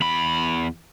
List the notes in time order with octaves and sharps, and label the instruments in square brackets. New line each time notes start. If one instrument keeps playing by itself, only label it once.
[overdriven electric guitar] E2 B5